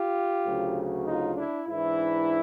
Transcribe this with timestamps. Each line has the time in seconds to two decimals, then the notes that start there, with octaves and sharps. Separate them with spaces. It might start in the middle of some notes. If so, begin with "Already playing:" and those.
Already playing: F4 G4
0.44 D2 C#3 F#3
1.06 D#4 F4
1.36 D4 E4
1.67 G#2 E3 D4 E4